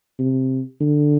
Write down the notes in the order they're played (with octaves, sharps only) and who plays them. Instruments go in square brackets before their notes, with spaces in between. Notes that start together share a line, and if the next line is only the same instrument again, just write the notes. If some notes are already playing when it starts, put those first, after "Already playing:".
[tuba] C3
D3